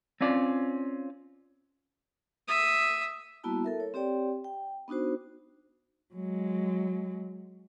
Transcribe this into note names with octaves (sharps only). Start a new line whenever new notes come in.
C4 C#4 F4 D5
E5 D#6
G3 A#3 B3 E4 F#4 A5
A4 A#4 E5
C#5
C4 G4 C#5 D5 G5
G5
B3 D4 D#4 F#4 C5
F#3 G#3